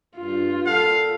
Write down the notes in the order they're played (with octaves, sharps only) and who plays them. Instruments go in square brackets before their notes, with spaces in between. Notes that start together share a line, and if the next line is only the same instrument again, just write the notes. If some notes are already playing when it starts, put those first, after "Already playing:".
[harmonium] G2 [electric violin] F4
[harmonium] A#2 A4 F#5 [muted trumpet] F5